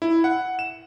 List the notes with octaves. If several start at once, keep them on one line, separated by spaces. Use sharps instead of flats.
E4
F#5
E7